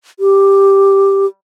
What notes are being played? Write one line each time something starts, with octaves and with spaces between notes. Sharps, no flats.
G4